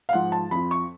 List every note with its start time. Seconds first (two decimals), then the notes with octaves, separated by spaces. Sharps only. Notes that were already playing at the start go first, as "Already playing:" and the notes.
0.09 F5
0.13 G#2 F3 F#5
0.32 A5
0.51 F2 F3 B5
0.71 C#6